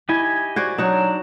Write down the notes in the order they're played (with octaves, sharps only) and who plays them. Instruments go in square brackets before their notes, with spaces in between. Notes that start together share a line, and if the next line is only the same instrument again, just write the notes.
[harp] E4 [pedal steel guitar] G4 D#5 G#5
[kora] F#4 C5 D5 [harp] G#6
[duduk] F#3 [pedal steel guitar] D4 [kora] D#4 F#4